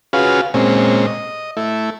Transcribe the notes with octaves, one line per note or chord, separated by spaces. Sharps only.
C#4 F4 F#4 G#4 B4 F5
A#2 G#3 C4 C#4
D#5
A3 E4